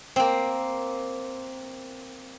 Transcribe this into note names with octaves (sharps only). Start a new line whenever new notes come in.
A#3 C4